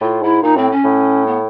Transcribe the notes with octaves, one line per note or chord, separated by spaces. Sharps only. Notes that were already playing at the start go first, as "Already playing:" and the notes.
A2 F4
G#2 E4
A#2 D#4
A2 C4
C#4
A2
B3